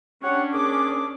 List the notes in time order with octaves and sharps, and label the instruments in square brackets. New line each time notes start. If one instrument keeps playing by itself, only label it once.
[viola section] C#4 D4 [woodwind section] G4 C#5 F#5
[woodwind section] D#2 G#4 D6